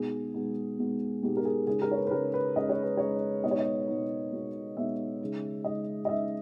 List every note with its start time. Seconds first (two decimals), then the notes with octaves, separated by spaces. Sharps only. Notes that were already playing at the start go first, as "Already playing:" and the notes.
Already playing: B2 G#3 B3 D#4 G#4
0.34 B2 G#3 B3 D#4
0.78 B2 G#3 B3 D#4
1.23 B2 G#3 B3 D#4 G4
1.37 A#4
1.45 G#4
1.67 C#3 G#3 D#4 G#4
1.82 A#4
1.91 C#5
1.96 B4
2.07 B4
2.11 C#3 G#3 D#4 A#4
2.34 B4
2.56 C#3 G#3 D#4 D#5
2.69 C#5
2.83 B4
2.97 C#3 G#3 D#4 C#5
3.43 B2 G#3 B3 D#4 D#5
3.51 C#5
3.59 D#5
3.88 B2 G#3 B3 D#4
4.32 B2 G#3 B3 D#4
4.77 B2 G#3 B3 D#4 E5
5.21 C#3 G#3 D#4
5.64 C#3 G#3 D#4 D#5
6.05 D#5
6.09 C#3 G#3 D#4 E5